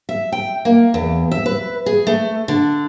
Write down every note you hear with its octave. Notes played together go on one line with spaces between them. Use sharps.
E5
G5
A#3
E2
E5
B4
G#4
A3
D3